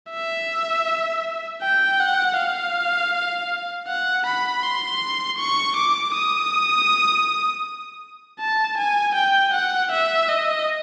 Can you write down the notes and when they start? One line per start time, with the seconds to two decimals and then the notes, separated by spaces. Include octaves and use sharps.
0.11 E5
1.62 G5
1.99 F#5
2.37 F5
3.87 F#5
4.26 B5
4.63 C6
5.38 C#6
5.76 D6
6.14 D#6
8.39 A5
8.77 G#5
9.15 G5
9.53 F#5
9.91 E5
10.28 D#5